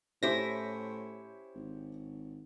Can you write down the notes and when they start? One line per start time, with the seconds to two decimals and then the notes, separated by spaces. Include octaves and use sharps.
0.23 A2 C#4 E4 G4 C5 A#6
1.56 G#1